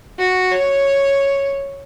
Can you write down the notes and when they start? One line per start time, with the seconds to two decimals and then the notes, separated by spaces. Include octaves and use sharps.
0.19 F#4
0.51 C#5